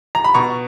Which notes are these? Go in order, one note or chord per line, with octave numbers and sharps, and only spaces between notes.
A#5
B5
B2 A#5 C#6